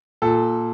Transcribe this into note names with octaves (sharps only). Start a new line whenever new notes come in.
A#2 A4